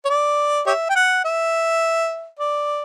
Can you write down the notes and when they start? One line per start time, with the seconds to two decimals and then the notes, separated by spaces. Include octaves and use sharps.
0.05 C#5
0.10 D5
0.67 G4 C#5 E5
0.90 G5
0.96 F#5
1.25 E5
2.39 D5